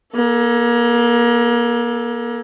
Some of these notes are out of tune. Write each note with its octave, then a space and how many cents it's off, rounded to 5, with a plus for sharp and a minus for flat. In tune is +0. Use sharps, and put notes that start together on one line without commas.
A#3 +35 A4 +0